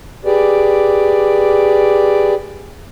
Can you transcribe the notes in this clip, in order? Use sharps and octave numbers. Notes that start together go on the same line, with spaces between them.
G4 G#4 B4 D5